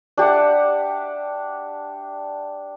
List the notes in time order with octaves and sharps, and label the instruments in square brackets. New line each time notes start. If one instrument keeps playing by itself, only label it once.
[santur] D4 G4 E5 F#5